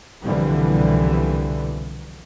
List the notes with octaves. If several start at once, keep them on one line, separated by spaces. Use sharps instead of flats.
C2 B2 D3 E3 F3 G3